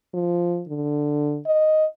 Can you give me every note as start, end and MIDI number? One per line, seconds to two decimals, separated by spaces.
0.14 0.63 53
0.68 1.39 50
1.46 1.85 75